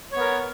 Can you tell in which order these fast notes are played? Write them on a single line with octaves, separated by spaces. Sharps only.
C#5 B3 A#4